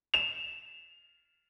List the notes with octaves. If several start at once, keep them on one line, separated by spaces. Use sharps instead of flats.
E7 F7